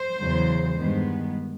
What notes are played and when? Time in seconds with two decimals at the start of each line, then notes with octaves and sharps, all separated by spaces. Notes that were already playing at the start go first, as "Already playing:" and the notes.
Already playing: C5
0.18 E2 C#3 F#3
0.79 G2 D#3 G#3 B3